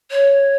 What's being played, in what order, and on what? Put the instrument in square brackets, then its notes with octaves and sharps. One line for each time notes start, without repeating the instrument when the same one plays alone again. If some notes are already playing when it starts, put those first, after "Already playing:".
[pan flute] C#5